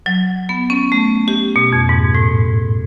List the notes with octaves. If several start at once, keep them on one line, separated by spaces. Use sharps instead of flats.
F#3
B3
C#4
A3
G4
B2
F2
G#2
A2